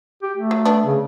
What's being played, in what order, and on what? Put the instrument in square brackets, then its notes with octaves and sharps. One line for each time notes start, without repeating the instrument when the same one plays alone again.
[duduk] G4
A3
[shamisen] F#3
B3 D4
[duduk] C#3